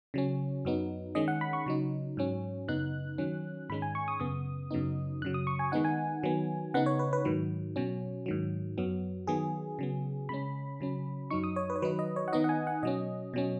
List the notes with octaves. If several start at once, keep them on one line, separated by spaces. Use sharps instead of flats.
C#3 F#3 C#4
F#2 F#3 B3 D#4
D#3 G#3 C#4 D#5
F#5
B5
C#6
C#3 F#3 D#4
G#2 F#3 C#4
F#2 C#3 B3 D#4 F#6
D#3 F#3 C#4
G#2 D#3 G#3 C#4 B5
G#5
C#6
D#6
F#2 C#3 B3 D#6
F#2 C#3 F#3 B3 D#4
F#2 C#3 F#3 F#6
D#6
C#6
G#5
D#3 G#3 B3 D#4 F#5
G#5
D#3 F#3 B3
C#3 B3 D#4 F#5
C#5
B4
B4
G#2 D#3 F#3
B2 F#3 C#4
G#2 D#3 F#3
F#2 F#3 B3
D#3 F#3 B3 G#4
C#3 F#3 B3
C#3 G#3 C#4 B5
C#3 F#3 C#4
F#2 F#3 D#4 C#6
D#6
C#5
B4
C#5
D#3 F#3 D#4 B4
D#5
C#5
F#5
D#3 B3 D#4 D#5
F#5
G#5
F#5
B2 F#3 C#4 D#5
B2 F#3 C#4